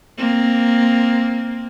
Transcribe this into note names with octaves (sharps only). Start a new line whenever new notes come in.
A#3 C4